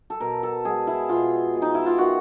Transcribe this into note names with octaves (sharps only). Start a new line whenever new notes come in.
A4
B2 A#4
A4
G#3 B3 G#4
E4
B2 F4
G#3 B3
D#4
E4
F4
D#3 F#4